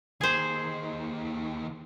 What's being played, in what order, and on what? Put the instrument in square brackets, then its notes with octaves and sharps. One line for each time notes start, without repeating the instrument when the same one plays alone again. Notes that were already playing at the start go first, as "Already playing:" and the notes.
[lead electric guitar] D#2 D#3 [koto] G#4 C5